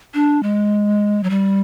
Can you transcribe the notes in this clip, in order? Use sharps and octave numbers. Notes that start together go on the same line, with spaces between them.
D4
G#3
F#3
G3